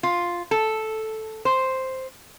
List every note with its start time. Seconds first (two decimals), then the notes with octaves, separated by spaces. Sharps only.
0.03 F4
0.51 A4
1.45 C5